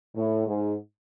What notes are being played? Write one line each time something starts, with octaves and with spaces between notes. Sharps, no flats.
A2
G#2